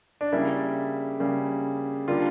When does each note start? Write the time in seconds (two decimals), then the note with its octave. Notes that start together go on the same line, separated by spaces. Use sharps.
0.21 D4
0.32 C#3 G3 A#3 E4
1.20 C#3 G3 A#3
2.08 D3 G3 A#3 F4